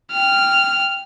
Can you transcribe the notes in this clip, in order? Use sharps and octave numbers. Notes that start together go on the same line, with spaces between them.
G5 F6